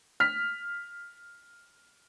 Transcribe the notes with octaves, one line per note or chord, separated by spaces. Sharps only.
F6 B6